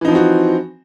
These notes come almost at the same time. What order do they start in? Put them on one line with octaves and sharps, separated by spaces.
E3 D#4 F3 C4 F#4